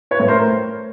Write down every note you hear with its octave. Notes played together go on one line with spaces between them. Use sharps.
B4 C#5
A2
A#4 C5